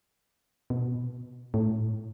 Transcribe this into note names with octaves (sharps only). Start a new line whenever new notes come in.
B2
A2